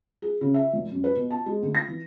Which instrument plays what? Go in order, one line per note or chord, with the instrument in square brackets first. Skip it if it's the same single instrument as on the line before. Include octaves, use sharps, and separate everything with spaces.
[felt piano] G#4
C#3
E5
F1
F#2
B4
B2
A5
G#3
D2
A#6
E3